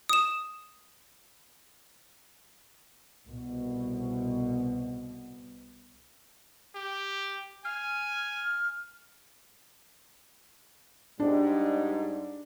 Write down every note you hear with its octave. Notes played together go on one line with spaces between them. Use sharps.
D#6 E7
C2 B2
G4
G#5 F6
G#2 G3 D4